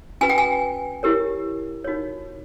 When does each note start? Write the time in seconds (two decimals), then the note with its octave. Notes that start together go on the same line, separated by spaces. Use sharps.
0.21 C#4 F#4 B4 G#5
0.30 G5
0.38 G#5
1.03 E4 G4 A#4 C#5
1.84 D#4 F#4 A#4 C#5